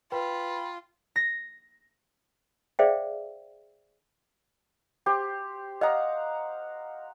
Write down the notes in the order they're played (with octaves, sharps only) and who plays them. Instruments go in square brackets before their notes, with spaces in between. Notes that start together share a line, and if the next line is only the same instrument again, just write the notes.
[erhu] F4 [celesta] B4 [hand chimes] G5 [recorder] B5
[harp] A#6
[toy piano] G#4 C5 D5 E5 F5 G5
[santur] G4 C5
[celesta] D#5 D#6 [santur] F5 F#5 A#5